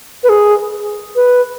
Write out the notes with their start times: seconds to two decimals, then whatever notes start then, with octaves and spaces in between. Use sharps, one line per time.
0.24 B4
0.29 G#4
1.16 B4